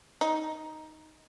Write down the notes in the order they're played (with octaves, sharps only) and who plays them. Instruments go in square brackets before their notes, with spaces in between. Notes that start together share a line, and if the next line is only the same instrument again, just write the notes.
[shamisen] D#4